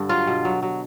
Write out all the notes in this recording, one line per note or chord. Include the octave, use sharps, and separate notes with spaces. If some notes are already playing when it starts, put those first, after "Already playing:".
Already playing: G2 D3
F#3 F4
B2
F#3
F#3